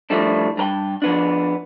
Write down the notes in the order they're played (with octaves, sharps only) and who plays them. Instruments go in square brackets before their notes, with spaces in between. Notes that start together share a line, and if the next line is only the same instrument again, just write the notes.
[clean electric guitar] A2 F3 G3 A3 D4
G2 A#4 G5
F3 B3 D4